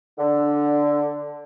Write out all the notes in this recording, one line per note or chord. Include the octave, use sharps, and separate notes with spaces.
D3